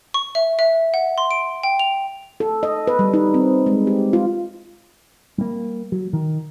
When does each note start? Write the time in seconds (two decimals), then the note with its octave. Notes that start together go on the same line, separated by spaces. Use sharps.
0.14 C#6
0.35 E5
0.59 E5
0.94 F#5
1.18 C6
1.31 D7
1.63 G5
1.79 F7
2.40 A4
2.63 D#5
2.87 B4
2.99 G3
3.14 D#4
3.34 C4
3.66 G#3
3.87 G4
4.13 F4
5.38 G3 A#3
5.92 F#3
6.13 D#3